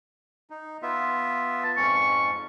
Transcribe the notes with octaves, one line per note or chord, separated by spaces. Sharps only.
D#4
B3 F4 E5
A5
F2 G#2 C#4 C#6